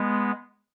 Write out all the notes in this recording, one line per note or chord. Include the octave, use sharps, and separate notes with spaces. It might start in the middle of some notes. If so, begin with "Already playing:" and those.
Already playing: G#3 B3